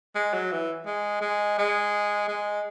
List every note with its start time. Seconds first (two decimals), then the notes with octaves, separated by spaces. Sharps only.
0.15 G#3
0.34 F#3
0.52 E3
0.86 G#3
1.22 G#3
1.58 G#3
2.28 G#3